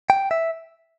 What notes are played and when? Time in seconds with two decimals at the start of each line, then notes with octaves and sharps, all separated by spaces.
0.10 G5
0.31 E5